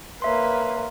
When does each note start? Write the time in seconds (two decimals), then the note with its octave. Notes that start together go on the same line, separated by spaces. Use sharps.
0.22 A#3 B4 C#5 E5 C6